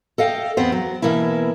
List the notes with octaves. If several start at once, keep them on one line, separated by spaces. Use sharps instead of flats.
A4 D#5 F5 G5
E2 B3 C4 C5
F#3
B2 E3 A#3 E4